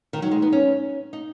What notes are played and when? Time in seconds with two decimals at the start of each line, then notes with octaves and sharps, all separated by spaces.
0.13 D#3
0.22 F#3 D#4
0.31 G#3
0.42 B3
0.52 C#4
1.13 D#4